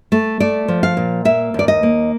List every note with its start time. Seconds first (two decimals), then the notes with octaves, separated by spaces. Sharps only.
0.12 A3
0.40 A3 D5
0.68 F3
0.83 F5
0.97 A#2
1.25 A#3 E5
1.54 D#2 D5
1.68 D#5
1.83 A#3